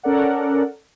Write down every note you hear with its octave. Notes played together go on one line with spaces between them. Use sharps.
C#4 A4 A#4 D5 F#5